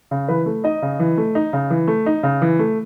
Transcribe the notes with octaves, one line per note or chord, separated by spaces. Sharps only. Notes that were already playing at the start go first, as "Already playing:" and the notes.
C#3
E3 B4
A3
D#4 D#5
C#3
E3
A3
D#4
C#3
E3
A3
D#4
C#3
E3
A3